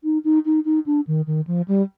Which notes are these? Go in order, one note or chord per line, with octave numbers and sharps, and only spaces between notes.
D#4
D#4
D#4
D#4
D4
D#3
D#3
F3
G3